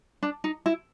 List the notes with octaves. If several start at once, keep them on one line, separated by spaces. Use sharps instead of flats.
D4
D#4
E4